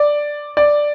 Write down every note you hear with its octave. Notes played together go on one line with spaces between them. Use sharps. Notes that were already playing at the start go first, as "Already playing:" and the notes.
Already playing: D5
D5